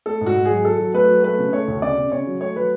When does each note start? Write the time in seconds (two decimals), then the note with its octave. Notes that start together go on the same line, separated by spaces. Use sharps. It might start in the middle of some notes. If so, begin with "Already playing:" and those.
0.06 A3 A4
0.21 G#2
0.26 F#4
0.36 G#2
0.45 G#4
0.50 F#3
0.65 F#3 A4
0.79 F#3
0.94 A3 B4
1.10 F#3
1.23 A3 B4
1.39 C#3
1.53 A3 C#5
1.68 D2
1.82 C#3 D5
1.98 C#3
2.12 C#3 C#5
2.27 F#3
2.41 A3 C#5
2.56 F#3 B4